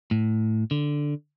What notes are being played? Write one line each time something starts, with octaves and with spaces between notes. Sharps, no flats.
A2
D3